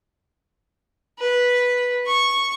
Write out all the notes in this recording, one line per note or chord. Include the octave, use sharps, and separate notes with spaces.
B4
C#6